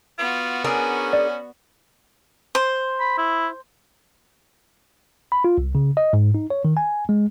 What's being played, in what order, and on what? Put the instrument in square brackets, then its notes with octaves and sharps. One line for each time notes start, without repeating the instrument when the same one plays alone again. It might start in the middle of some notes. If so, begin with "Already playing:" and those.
[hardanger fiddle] B3 F#4 [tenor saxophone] F4
[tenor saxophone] C#4 [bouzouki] D4 G#4 A#4
[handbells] D5
[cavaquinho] C5
[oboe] B5
E4
[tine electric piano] B5
F4
C2
C#3
D#5
G#2
D#4
C#5
D#3
G#5
G#3